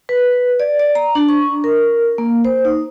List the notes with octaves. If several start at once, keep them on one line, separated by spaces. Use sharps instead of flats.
B4
D5
D5
A#5
D4
C#6
A#4
A#3
C5
D#4